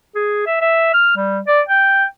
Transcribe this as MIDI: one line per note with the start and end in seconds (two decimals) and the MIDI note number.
0.15 0.46 68
0.46 0.59 76
0.61 0.92 76
0.94 1.11 89
1.16 1.40 55
1.47 1.61 74
1.69 2.05 79